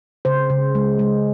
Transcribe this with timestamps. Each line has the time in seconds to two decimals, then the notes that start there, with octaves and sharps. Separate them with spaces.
0.25 C#3 C5
0.50 C#3
0.75 G#3
0.99 G#3